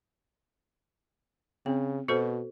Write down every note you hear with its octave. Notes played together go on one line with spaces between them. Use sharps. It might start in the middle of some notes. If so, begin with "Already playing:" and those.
C#3 C4
B2 F#4 A4 C5